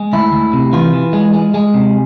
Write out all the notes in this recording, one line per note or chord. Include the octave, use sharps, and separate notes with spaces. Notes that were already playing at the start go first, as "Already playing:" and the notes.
Already playing: G#3
D2 E4
D2
C3
E3 F4
E3
G#3
G#3
G#3
C3